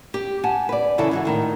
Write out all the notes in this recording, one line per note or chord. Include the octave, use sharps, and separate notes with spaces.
G4
F#5 G#5 A5
B4 D5
C#3 E3 C#4 E4 A4
G#2 E3 F#4
A2 D#3 D#4